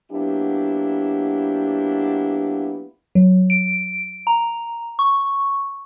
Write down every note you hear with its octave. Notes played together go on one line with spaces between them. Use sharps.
F#3 A#3 B3 D4 E4 G4
F#3
D7
A#5
C#6